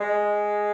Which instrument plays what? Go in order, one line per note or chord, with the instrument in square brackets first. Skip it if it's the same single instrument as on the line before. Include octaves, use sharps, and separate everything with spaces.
[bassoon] G#3